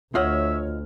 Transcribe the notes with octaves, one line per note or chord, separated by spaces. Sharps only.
D2 F4 C#5 D#5 E5 F#5 F6